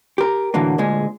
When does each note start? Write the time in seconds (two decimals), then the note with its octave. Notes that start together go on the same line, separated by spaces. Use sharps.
0.18 G4 A#4
0.54 A2 D3 E3 F#3 A#3
0.78 D2 A#2 G#3 G#4